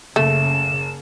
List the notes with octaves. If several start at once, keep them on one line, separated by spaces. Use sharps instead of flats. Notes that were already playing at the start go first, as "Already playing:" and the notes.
F#1 C#3 A3 E7